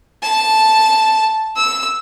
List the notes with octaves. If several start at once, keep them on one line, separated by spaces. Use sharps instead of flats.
A5
E6